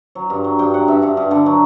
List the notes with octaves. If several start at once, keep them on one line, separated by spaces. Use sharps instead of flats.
F#3
G2
F#3
G2 G5
F#3 F#5
G2 E5
G2 F#5
G2
D3
F#3